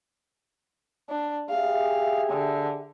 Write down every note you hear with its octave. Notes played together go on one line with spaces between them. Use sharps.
D4
G4 G#4 E5 F5
D3